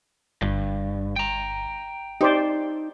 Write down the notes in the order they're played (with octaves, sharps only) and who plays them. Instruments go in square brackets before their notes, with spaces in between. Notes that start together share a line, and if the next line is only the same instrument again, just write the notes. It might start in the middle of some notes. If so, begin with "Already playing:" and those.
[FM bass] G1 [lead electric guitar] G2
[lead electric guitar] G5 A#5
[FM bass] D#4 [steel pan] G4 C5 D5